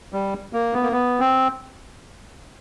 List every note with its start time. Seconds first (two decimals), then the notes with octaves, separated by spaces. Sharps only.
0.13 G3
0.53 A#3
0.73 B3
0.83 A#3
0.92 B3
1.20 C4